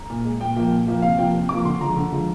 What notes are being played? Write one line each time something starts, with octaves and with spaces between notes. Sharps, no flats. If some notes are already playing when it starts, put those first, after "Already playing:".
Already playing: A#5
A#2
G#3
A#2 G5
F3 A#3
A#2
F3 A#3
C3 F5
F3 A#3 G5
C3
F3 A#3 D6
D3 C6
F3 G#3 A#5
D3
F3 G#3